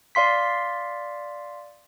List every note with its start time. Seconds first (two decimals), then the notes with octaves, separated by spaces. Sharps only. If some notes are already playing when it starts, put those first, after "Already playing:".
0.15 D5 F5 C6 B6